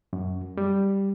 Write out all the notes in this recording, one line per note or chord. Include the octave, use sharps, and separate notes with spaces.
F#2
G3